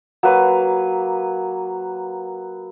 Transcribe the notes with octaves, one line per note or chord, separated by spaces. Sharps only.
F#3 A#3 B4